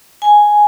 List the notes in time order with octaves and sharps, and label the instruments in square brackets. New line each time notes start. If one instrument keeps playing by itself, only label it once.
[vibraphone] G#5